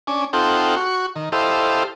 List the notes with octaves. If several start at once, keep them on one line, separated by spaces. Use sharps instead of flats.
C#4 D4 G#5
C4 D#4 F4 A4 F#5 G5
F#4 C#6
D#3
E4 G4 A4 C5 D#5 F5